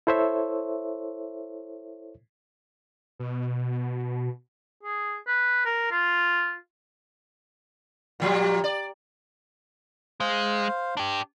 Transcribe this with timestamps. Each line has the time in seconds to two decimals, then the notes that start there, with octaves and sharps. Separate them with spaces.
0.07 E4 A4 C5 C#5 E5
3.20 B2
4.83 G#4
5.27 B4
5.65 A#4
5.91 F4
8.20 A#2 F3 G3
8.64 D5
10.20 G#3 C5 F5
10.97 D4 G4